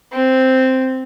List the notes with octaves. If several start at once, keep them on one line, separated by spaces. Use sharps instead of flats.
C4